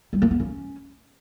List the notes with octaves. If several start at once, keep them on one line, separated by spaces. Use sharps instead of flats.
G3
A#3
B3
C#4